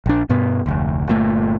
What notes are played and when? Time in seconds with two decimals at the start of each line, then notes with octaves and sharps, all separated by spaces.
0.06 A#1 D4
0.29 G2 B2 B3
0.66 F1 D2
1.08 G1 A#2 A3